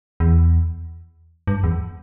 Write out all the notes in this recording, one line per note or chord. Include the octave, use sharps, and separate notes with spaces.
E2
G2
E2